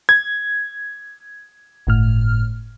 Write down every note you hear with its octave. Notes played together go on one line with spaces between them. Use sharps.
G#6
G1 A2 F6